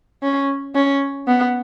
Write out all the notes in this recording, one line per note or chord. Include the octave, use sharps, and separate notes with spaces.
C#4
C#4
B3